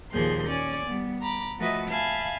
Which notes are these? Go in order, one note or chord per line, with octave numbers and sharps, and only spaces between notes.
D#2 A#2 F3 G#4 C6 G6
C#4 D5 G#5
G3 B3
A#5 B5 D6
F3 A3 F#4 B4 D#5 E5
E5 F5 G#5 A5 B5